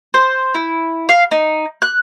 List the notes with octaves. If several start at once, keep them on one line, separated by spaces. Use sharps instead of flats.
C5
E4
F5
D#4
F#6